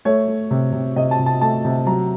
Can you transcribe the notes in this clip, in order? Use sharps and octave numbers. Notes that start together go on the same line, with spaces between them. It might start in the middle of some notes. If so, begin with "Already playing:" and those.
A3 C#5
A3
C3
C3
C3 D#5
A5
C3
A5
A3 A5
C3
F#3 A#5